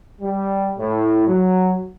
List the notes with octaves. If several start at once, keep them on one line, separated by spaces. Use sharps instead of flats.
G3
A2
F#3